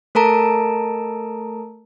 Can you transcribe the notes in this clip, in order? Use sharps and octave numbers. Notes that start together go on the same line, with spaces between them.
A3 A4 A#4 A5 A#5 D7